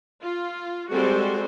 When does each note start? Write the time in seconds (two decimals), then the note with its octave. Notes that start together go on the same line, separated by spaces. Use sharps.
0.23 F4
0.92 G3 G#3 C4 F#4 A4 C5